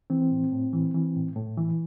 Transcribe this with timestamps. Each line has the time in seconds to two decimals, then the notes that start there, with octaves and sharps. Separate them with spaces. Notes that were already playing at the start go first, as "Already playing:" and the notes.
0.10 E3 C4
0.31 A2
0.52 A2
0.73 E3
0.94 E3
1.16 A2
1.36 A2
1.57 E3